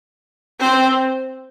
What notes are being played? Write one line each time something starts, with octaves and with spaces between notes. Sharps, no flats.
C4 C5